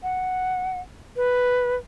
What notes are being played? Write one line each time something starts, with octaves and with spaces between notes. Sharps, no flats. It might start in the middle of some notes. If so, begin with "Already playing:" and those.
F#5
B4